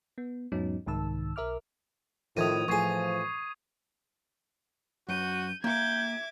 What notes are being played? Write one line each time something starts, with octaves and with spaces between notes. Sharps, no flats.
B3
E2 G#2 F#3 B3 C#4 D#4
C2 G#2 D#3 A5 E6
B1 A#4 E5 D6 F6
F2 A2 D#3 D#6 G#6 D#7
A1 F3 G#4 C#6 G#6 C7
F#2 F#4 G6 D#7
A#3 E5 G5 D6 G6 G#6